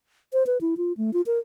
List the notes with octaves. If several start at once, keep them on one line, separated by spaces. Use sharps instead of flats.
C5
B4
E4
F4
A3
F4
A#4